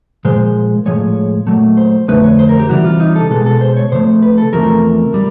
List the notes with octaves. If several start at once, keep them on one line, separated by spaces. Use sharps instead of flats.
A#2 F3 G#3 C5
A2 F3 G#3 C#5
A#2 F#3 A3
C5
F2 D3 F3 A3 B4
C#5
C5
A#4
G4
C3 E3 G3 F#4
F4
D#4
A4
B2 G#3 A4
A4
C5
C#5
C3 F3 A3 C5
B4
A4
E2 C3 F3 A3 A#4
G3